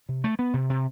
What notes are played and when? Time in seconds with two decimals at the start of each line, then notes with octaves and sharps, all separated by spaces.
0.09 C3
0.24 A3
0.39 B3
0.54 C3
0.70 C3